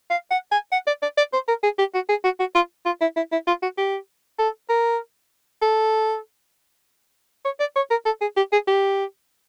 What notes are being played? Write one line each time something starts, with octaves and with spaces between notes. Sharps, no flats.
F5
F#5
G#5
F#5
D5
D5
D5
C5
A#4
G#4
G4
F#4
G#4
F#4
F#4
F4
F4
E4
E4
E4
F4
F#4
G4
A4
A#4
A4
C#5
D5
C#5
A#4
A4
G#4
G4
G#4
G4